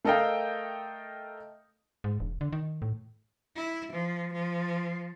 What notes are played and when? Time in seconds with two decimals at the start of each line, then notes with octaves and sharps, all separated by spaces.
0.05 A3 A4 A#4 D#5 F5 G5
2.04 G#2
2.20 E1
2.41 D3
2.53 D#3
2.82 A2
3.56 E4
3.92 F3
4.33 F3